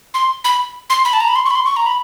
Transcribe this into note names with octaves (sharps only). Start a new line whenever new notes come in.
C6
B5
C6
B5
A5
A#5
B5
C6
C#6
B5
C6
C#6
A#5
B5